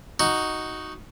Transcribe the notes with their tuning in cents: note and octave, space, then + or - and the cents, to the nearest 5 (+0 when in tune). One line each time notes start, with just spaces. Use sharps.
D#4 +0 F#4 +0